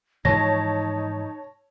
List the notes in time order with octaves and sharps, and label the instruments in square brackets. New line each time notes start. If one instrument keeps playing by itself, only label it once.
[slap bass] G#2 E3 F3 [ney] D#4 [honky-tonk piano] C#5 A5 [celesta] A#6